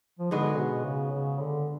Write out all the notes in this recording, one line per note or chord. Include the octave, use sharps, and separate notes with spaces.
F3
G#2 D3 G#3 B3 F#4
B2
C#3
C#3
D3